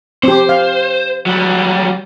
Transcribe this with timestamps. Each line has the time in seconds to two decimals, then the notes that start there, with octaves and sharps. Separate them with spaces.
0.23 C4 G4 C5
0.49 F5
1.26 F#3 G3